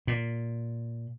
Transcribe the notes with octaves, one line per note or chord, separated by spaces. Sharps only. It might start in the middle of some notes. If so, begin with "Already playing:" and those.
A#2